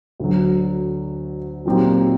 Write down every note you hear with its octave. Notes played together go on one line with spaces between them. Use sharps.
D2 D3 F#3
A#2 F#3 C4 D#4 G4